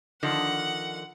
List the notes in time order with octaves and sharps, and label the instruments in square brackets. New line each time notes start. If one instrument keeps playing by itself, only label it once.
[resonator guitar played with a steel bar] D3 D#3 F3 [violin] F#5